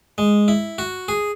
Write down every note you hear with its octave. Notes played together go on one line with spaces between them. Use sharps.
G#3
E4
F#4
G#4